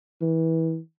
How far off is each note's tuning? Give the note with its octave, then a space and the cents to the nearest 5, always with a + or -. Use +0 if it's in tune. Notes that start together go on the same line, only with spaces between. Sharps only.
E3 -25